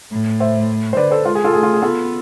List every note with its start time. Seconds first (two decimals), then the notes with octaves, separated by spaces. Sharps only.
0.11 A2
0.40 C5 E5
0.93 C5
0.97 D3 B4 D5
1.11 A4 C5
1.25 G#3 F4 A4
1.35 G#4
1.44 F4 A4
1.53 A3 G#4
1.63 F4
1.74 G#4
1.82 B3 F4 A4